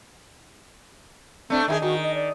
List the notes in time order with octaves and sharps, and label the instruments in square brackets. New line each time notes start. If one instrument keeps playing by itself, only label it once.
[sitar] A3 D4 [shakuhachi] C4
[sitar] D#3 E4 G#4 [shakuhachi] E5
[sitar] D#3 [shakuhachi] F#4
[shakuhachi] D#5
D5